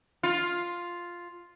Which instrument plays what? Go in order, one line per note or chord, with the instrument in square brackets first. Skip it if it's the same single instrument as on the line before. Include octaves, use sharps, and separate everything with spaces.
[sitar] F4